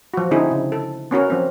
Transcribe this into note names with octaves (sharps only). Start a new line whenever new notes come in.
F3 F#4
D3 C4 D#4 E4 G#4
C#3
A4
B3 C#4 F#4 A#4
F3 C4